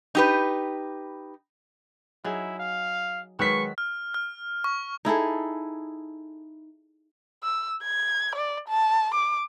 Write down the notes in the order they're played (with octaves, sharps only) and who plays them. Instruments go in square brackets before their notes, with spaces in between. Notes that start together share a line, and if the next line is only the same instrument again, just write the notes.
[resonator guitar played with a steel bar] D#4 G4 B4
[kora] F#3 D#4 G#4 [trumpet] E4
[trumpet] F5
[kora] D#3 F#3 F#4 [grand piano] G#3 B4 B6 [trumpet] C#6
[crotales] F6
F6
C#6
[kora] D#4 E4 G#4 A4
[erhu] E6
G#6
D5
A5
D6